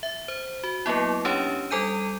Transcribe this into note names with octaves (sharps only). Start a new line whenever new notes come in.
E5
C5
F#4
F#3 A#3 B3 E4
C#4 D4 G4 C#5
G3 A4 G#5 G6 D#7